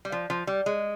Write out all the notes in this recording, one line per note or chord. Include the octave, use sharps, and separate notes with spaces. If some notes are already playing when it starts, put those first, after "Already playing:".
G3
F3
F3
G3
G#3